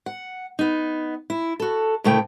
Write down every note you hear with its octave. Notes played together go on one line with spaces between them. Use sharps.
F#5
B3 D#4
E4
F#4 A4
D2 A#2 C#3 A3 E4 G5